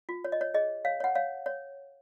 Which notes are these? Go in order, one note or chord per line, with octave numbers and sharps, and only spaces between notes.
F4
C#5
D#5
C#5
G#4 D#5
C#5 F5
C#5 F#5
C#5 F5
C#5